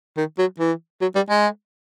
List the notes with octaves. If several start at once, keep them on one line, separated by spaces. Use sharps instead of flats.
D#3
F#3
E3
F#3
G3
G#3